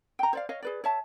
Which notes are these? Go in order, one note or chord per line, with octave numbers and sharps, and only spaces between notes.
G5 A#5
C5 D5 F5
C#5 D#5 F5
G#4 B4 D5
C#5 E5 A5